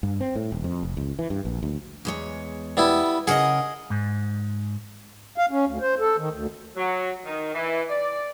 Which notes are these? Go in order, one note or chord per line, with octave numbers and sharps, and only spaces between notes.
G2
C4
A2
D#1
F2
F1
C#2
E3
G2
A#1
D2
E2 G#3 C#5
G3 B3 E4
C#3 G#4 A#4 D#5 F#5
G#2
F5
C#4
D2
C5
A4
D#3
D2
F#3
D#3
E3
D5